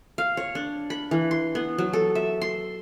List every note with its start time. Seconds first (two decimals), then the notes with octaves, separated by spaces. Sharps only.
0.18 F5
0.37 C#5
0.55 D4
0.90 B5
1.11 E3
1.31 C6
1.55 B3
1.78 F#3
1.93 A4
2.15 E5
2.41 C6